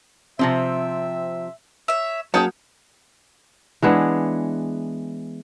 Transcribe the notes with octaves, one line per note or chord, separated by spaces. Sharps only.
C3 F3 C4 E5
C#5 E5
F#3 A#3 C#4 G#4 C#5 G5 A5 G6
E3 G#3 B3 D4